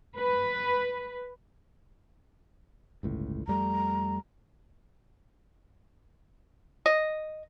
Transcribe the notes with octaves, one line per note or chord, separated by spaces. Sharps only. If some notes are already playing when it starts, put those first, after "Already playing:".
B4
G1 C#2 A2
F2 G3 A3 A#5
D#5